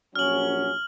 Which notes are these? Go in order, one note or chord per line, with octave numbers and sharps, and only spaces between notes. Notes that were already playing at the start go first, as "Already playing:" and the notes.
A#1 F#3 C#4 F6 F#7